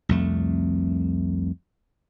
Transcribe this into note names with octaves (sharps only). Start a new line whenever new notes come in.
C2 F2 A3